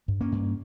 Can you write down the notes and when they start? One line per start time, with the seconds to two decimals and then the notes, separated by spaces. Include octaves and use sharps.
0.08 G2
0.21 A#3 C#4
0.32 G2